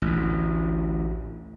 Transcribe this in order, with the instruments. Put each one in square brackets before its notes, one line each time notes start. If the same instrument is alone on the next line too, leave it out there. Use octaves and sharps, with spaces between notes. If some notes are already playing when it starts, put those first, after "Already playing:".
[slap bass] A1 D2